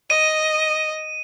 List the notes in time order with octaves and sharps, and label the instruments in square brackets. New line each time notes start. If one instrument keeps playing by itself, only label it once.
[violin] D#5 [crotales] D#7